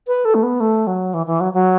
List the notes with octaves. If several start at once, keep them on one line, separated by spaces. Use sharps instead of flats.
B4
A4
A3
B3
A3
F#3
E3
E3
F#3
F#3